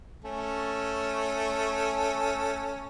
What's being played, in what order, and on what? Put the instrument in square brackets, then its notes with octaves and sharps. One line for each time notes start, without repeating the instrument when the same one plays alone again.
[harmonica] A3 C#4 A4